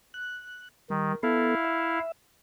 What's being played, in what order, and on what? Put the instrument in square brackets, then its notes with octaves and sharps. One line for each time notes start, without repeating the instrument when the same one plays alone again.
[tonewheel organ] F#6
[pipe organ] D#3 [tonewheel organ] G3
[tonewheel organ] B3 A4 [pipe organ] E4 F5
[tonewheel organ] E5